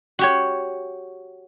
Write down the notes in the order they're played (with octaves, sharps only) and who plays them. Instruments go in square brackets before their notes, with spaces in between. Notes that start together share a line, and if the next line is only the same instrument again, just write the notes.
[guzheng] F#4 G4 C#5